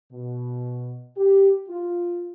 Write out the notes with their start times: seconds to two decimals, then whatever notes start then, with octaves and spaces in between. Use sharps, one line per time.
0.12 B2
1.17 G4
1.68 F4